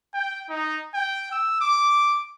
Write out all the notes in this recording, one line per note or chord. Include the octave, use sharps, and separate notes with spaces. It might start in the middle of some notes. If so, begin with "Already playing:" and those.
G5
D#4
G5
E6
D6